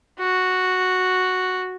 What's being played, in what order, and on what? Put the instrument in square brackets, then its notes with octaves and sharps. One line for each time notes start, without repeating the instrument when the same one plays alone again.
[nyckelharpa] F#4